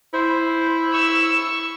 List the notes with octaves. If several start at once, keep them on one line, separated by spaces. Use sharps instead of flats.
E4 C5
C#6 E6